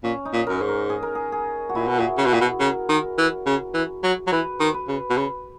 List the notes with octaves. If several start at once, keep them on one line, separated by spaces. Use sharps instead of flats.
A#2 C#4
D#4
A#2
F#2 A#4
G#2
A#4
G#4
A#4
G#4
G#4
F#4
A#2 E4
B2
A#2
C#3
B2
A#2
B2
C#3 A#4
D#3
E3
C#3
E3
F#3
F#3
E3 B4
D#3
B4
C#3
B2
C#3